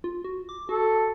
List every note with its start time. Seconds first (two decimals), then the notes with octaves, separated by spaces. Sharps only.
0.04 F4
0.24 F#4
0.49 D6
0.69 F#4 A4